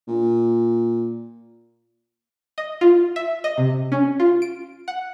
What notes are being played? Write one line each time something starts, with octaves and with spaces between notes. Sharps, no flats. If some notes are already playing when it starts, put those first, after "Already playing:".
A#2
D#5
F4
E5
D#5
C3
C#4
F4
D7
F#5